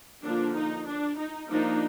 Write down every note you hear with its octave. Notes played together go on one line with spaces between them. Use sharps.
D3 F3 A#3 D4
D#4
D4
D#4
F3 A#3 D4 D#4